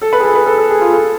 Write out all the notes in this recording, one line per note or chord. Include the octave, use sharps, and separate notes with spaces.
A4
B4
G#4
A4
B4
A4
A4
G#4
F4
A4